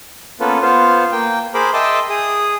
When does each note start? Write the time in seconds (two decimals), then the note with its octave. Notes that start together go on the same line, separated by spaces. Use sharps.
0.40 A#3 B3 C#4 F4 A4 B4
0.62 B3 F4 C5
1.12 A#3 G5
1.54 G#4 A#4 C5 B5 D6
1.74 D#5 E5 G5 A5 C6 D6
2.09 G#4 D#6